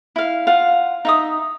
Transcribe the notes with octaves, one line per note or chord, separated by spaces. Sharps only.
E4 F5
F4 F5 F#5
D#4 E5 D#6